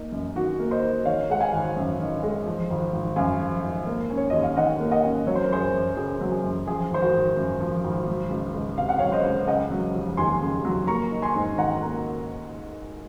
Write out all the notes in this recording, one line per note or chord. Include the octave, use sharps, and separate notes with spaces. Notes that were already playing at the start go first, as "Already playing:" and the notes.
Already playing: A#3 D#4
F#2
D#3 F#4
A#3
C5 D#5
D#4
D#3 C#5 F5
G#3 F#5
F5 G#5
G#1
F#2
D#3
G#3
F3
G#1
G#1
F#2 F5 G#5
F3
G#1
A#3
C#4
C#5
D#2 D#5
F5
D#3 D#5 F#5
A#3
D#5 F#5
C#4
F#3 C#5
C5
A#4
F#2 G#4 C5
F#2
C#3 G#4
F#3
G#4
F#2
F3 G#4
G#1 C5
F#4 A#4
G#1
F#2
F3
G#1
F#3
C#2
C#2
C3 F5
F#5
F#3 C#5 F5
C5 D#5
C#2
C#3 D#5 F#5
F#3
F1
D#2 G#5 C6
C#3
F#3
A#3 A#5 C#6
D#4
G#5 C6
G#2
D#3 F#5 A#5
A#3 A#5